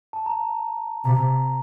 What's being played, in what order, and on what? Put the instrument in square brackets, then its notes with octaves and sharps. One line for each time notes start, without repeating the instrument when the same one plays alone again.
[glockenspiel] A5
A#5
[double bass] C3 [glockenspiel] A#5